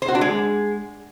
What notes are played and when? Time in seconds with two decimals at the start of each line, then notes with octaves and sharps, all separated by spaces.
0.02 C5
0.08 F#4
0.15 D4
0.21 G#3